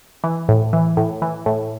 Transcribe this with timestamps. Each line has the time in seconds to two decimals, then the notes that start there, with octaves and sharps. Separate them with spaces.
0.24 E3
0.49 A2
0.73 E3
0.97 A2
1.22 E3
1.46 A2